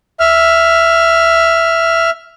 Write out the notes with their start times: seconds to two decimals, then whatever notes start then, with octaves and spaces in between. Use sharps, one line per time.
0.20 E5 F6